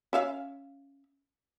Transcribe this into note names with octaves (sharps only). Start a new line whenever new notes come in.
C#4 E5 F5